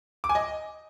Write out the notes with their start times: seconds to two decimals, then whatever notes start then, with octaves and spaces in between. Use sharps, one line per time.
0.24 D6
0.29 G#5
0.35 D#5